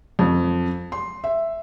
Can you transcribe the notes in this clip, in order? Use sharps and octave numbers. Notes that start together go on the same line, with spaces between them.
F2
C6
E5